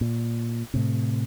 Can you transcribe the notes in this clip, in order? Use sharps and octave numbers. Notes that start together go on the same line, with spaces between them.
A#2
A2 C3